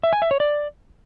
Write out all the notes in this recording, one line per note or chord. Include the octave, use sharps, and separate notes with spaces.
E5
G#5
E5
C#5
D5